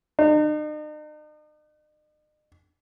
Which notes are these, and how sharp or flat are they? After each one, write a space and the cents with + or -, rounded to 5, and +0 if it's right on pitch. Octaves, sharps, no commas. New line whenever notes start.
D#4 -45